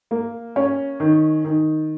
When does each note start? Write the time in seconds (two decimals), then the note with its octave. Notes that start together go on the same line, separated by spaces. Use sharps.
0.11 A#3
0.56 C#4
1.00 D#3
1.44 D#3